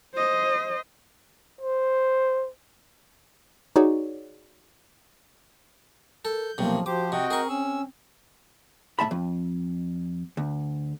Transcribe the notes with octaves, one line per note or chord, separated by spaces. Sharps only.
C5 D#5
C5
D#4 F#4 G#4 C#5 D5
A4 A#4 G6
B1 C3 F3 A#3
F3 F#4 G4 C5 D6
C3 C4 F#4 D#5 G5
G#4 A#4 C#6
C#4 E6
A2 G3 E5 A5 B5
F2
D2